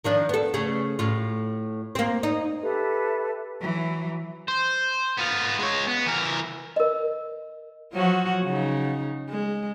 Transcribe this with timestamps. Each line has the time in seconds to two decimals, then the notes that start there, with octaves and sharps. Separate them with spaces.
0.04 D#3 F3 D4
0.29 B3 A4
0.54 C#3 A3
0.99 A2 F4
1.95 A#3 C4
2.23 D#4
2.62 G4 A4 B4 E5
3.61 E3 F#3
4.48 C5
5.17 B3 F4
5.59 G#3 C#5
5.87 B3
6.06 E3 A#4
6.76 A#4 D#5
7.93 F3 F#3 F#4
8.44 C#3 D#4
9.29 G#3